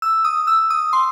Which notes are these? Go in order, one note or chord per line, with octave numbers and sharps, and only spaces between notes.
E6
D#6
E6
D#6
C6